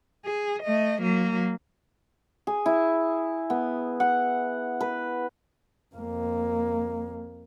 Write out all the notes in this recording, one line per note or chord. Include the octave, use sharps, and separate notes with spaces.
G#4
A3 D#5
F#3 A#3
G#4
E4
B3
F#5
B4
F2 A#3